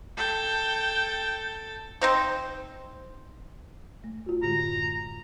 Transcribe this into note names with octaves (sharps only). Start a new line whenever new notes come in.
A4 G5
C4 D#4 C5
A3
F4 F#4
A2 D3 G#3 A#5
F#2